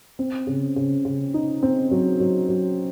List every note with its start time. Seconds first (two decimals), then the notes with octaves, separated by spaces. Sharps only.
0.19 C4
0.47 C#3
0.76 C#3
1.05 C#3
1.34 D#4
1.63 C4
1.91 F#3
2.20 F#3
2.49 F#3